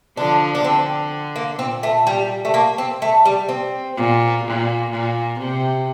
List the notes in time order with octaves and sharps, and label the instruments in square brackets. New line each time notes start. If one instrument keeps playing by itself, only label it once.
[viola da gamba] D3 F3 [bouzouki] D4
[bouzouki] D4
[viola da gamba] D3 [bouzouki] C4
[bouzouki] A#3
[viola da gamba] A#2 [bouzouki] C4
[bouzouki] A3
G3
A3
A#3
C4
A3
G3
C4
[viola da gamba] A#2
A#2
A#2
C3